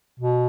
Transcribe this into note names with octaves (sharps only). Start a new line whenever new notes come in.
B2